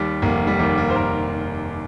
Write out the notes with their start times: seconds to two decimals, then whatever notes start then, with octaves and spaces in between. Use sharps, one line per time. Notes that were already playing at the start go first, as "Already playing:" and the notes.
Already playing: D#2 G3
0.22 F1 A#3
0.47 G3
0.59 D#2 A#3
0.78 A#3
0.90 C5
0.96 F1 A#4